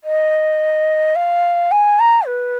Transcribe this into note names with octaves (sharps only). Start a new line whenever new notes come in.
D#5
F5
G#5
A#5
B4